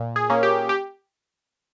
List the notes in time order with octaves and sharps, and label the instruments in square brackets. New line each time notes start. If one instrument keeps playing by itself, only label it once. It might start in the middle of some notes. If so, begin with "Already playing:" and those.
Already playing: [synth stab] A#2
G#4
A#3 C#4
G4
G4